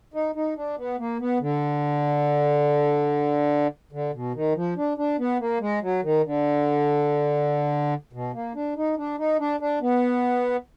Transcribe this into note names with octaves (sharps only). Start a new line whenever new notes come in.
D#4
D#4
D4
B3
A#3
B3
D3
D3
B2
D#3
F3
D4
D4
B3
A#3
G#3
F#3
D#3
D3
B2
A#3
D4
D#4
D4
D#4
D4
D4
B3